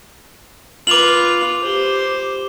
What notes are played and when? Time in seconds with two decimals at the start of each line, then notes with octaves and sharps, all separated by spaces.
0.87 F4 B4 D6 F7 F#7
1.63 G4 C5